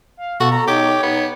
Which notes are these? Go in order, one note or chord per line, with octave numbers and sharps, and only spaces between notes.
F5
B2 F#4 A4
A#5
D#4 G4 C#5
B3 D#4